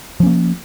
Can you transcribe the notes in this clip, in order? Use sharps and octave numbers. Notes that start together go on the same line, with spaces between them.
F3 A#3 C#4